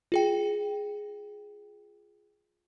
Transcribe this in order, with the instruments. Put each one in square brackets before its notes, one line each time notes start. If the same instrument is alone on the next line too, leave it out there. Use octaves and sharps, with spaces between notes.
[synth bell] F4 G#4 G5